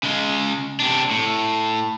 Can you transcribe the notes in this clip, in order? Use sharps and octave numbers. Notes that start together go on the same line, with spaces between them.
C#3 G#3
C3 D4
A2